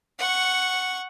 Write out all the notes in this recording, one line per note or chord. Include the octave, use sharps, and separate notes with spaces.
F#5 C#6